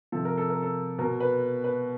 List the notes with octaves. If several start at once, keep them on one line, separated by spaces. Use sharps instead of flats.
C3 F3 A4
A#4
A4
A#4
A4
B2 A#4
B4
B4